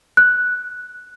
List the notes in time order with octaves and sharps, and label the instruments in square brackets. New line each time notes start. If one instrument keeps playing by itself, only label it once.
[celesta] F#6